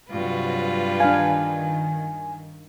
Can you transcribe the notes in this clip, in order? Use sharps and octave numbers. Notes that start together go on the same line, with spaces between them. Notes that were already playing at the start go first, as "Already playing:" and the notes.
G2 C3 F#3 F4 F#4 B4
D#3 D4 F5 G#5